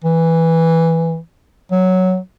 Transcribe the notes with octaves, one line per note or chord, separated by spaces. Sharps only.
E3
F#3